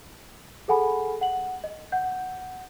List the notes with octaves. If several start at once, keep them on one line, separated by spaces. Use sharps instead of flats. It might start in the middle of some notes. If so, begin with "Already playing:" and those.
G#4 A4 F#5 G#5 B5
F#5 F#7
D#5
F#5 G6